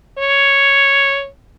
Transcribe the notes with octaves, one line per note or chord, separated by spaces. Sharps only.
C#5